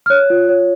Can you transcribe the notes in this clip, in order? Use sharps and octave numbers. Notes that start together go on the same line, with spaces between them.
F6
C#5 F#6
F4
C#5